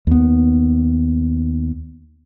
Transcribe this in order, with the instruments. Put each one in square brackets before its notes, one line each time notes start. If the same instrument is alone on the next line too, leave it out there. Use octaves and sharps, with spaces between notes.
[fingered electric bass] D#2 B3